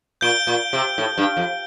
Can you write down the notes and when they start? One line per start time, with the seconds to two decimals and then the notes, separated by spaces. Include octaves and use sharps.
0.21 A#2 G6 D7 G7
0.47 A#2
0.73 C3
0.98 A2
1.18 G2
1.37 F2